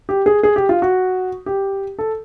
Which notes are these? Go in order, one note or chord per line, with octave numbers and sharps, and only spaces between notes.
G4
G#4
G#4
G4
F4
F#4
G4
A4